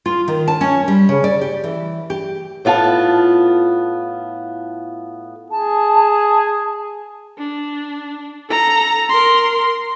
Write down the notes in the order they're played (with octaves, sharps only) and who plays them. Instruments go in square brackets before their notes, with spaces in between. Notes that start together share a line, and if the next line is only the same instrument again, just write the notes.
[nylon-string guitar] F4
D#3
A5
C#4
G3
C#3
D5
G4
E3
G4
[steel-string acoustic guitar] A2 B3 F4 A4 A5
[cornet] G#4 [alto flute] A5
[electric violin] D4
A4 A#5
A#4 C6